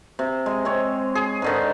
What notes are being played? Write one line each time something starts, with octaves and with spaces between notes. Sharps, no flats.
C3
G#3
C4 C#5
G#4
G#2 D3 D#3